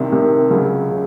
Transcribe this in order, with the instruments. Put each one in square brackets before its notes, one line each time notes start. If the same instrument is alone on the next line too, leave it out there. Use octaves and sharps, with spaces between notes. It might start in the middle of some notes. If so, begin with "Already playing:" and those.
Already playing: [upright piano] C2 C3 D#3
C2 C3 D#3
C#2 C#3 F#3
C#3